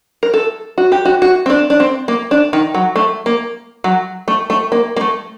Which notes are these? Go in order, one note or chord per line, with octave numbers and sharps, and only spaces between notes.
A#4
A4
F#4
G4
F#4
F#4
C4
D4
D4
C4
A#3
D4
D#3
F#3
A3
A#3
F#3
A3
A3
A#3
A#3
A3